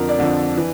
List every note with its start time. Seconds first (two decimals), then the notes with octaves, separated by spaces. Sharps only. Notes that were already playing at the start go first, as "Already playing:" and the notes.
Already playing: F2 D3 F3 A#4
0.09 D5
0.18 F2 D3 F3
0.57 E3